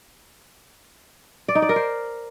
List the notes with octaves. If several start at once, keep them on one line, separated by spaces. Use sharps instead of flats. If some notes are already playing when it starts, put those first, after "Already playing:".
D5
D#4
D5
A#4
C5